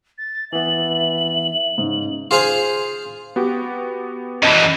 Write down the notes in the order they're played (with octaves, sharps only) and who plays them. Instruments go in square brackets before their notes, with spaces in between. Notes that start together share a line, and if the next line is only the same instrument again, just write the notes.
[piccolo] A6
[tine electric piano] E3 B3 [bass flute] E5 [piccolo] F#7
[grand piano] G#2 C#3
[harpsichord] F4 G#4 C5 F5 G#5
[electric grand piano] B3 F#4 G4
[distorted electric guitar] F#2 E3 [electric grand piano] D#5 A5 B5